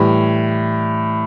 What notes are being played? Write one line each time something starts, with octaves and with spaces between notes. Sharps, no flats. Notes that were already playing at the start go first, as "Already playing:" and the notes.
Already playing: A2 E3 G3